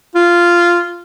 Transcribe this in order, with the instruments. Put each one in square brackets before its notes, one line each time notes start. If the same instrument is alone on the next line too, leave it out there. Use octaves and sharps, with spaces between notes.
[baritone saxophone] F4